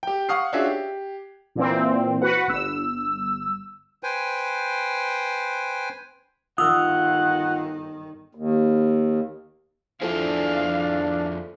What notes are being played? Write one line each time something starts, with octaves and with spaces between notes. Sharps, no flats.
G4 G5
F5 F#5 C#6 D#6 F6 C7
C#4 D4 F4 F#4 G#4 E5
G4
A#2 E3 C4
F#4 B4 F#5
G1 E6
B4 C5 G5 G#5
G1 D#3 F4 F#5 D#6 E6
D#2
F2 D4 E4 F4 G#4 A4 C5 F5